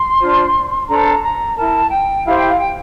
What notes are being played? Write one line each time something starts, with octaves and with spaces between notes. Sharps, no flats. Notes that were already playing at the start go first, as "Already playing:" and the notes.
Already playing: C6
D4 F4 C5
D4 A4 C5 A#5
A#5
E4 A#4 A5
G5
E4 G4 C5 F5
G5
F5
G5